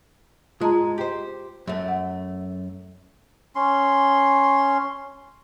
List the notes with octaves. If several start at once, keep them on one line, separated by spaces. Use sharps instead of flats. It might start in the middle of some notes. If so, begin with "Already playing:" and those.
G#2 G#3 F4 A5 A#5
G4 C5
F#2 A3
F#5
C#4 C6